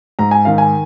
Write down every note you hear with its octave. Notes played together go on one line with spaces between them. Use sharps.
G#2 A#5
G#5
D#3 F5
G#5